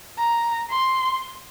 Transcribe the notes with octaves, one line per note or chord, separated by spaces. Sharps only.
A#5
C6